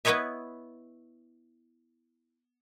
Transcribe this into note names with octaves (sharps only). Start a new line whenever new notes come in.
B3 E4 B4 C#5 D#5 E5